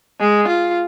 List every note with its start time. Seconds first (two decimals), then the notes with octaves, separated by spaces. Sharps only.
0.20 G#3
0.48 F4